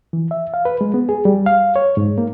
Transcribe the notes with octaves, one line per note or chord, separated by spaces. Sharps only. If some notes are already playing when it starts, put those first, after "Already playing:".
E3
E5
F5
B4
G#3
B3
G#4
G3
F5
C#5
G#2
A#3